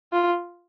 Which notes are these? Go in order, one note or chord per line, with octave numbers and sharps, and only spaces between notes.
F4